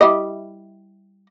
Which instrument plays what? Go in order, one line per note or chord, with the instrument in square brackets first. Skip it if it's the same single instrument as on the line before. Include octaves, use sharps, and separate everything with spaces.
[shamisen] G3 E4 D#5